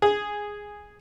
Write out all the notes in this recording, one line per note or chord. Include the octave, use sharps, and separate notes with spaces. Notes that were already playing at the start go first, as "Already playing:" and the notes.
G#4